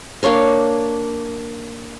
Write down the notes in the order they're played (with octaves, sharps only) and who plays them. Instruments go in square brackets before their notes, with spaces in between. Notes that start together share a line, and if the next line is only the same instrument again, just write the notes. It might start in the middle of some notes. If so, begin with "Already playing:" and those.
[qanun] A#3 D4 C#5 F5